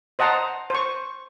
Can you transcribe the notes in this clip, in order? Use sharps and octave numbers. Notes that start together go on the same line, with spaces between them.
C5 D#5 F#5 A5 A#5 C6
C5 C#6